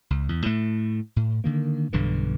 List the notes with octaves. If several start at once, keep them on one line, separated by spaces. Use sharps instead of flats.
C#2
E2
A2 A3
A2
D3 D#3 A#3
B1 G2 D3 E3